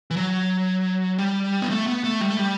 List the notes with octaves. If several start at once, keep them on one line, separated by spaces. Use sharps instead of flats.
E3
F#3
G3
B3
A3
B3
A3
G3
A3
G3